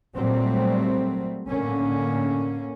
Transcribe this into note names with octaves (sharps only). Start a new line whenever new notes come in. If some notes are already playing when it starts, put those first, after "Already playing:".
A#2 F#3 G3 A3 C4
A2 D3 A#3 C#4